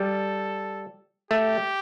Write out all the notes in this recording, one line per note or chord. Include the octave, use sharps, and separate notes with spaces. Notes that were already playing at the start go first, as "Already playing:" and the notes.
Already playing: G3 A4
A3 G4